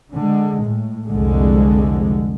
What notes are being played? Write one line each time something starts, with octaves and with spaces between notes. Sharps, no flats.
D3 G#3
A2
C2 F2 D3 G#3